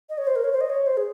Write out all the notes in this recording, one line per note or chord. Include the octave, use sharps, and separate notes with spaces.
D#5
C#5
C5
A#4
C#5
C5
D#5
C#5
C5
G#4